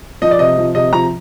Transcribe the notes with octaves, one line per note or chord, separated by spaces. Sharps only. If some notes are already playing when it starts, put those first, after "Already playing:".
F3 D#5
D5
C3 D#5
F3
C3 D#5
F3 A#5